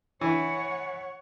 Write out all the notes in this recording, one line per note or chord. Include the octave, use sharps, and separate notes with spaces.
E3 C#5 F#5